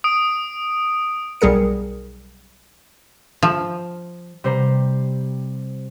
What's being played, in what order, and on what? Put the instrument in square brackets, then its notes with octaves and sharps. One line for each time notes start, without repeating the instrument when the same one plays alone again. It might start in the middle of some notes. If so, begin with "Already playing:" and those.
[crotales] D#6 D7
[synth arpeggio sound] B1 G3 G#4 A#4 C#7
[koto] F3
[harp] C3 G3 C5 A#5